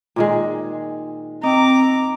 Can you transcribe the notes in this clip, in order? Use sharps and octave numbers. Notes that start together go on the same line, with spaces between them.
A#2 D#3 G#3
C4 D#4 A#5 D6